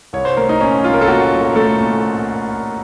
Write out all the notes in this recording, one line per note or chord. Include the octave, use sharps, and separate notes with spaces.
C2 C#5
C5
A3 A#4
D#4
A#2 C#4
C2 F4
A#4
A4
A#2 F#4
C2
A3 A4
A#2